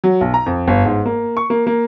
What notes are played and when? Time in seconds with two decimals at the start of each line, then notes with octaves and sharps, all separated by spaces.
0.04 F#3
0.21 B1
0.34 A#5
0.46 F2
0.68 G1
0.85 G#2
1.05 A#3
1.37 C#6
1.50 A#3
1.67 A#3